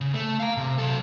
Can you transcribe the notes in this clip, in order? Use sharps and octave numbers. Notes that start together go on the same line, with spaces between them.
C#3
A3
F5 A#5
C3
F#3 A4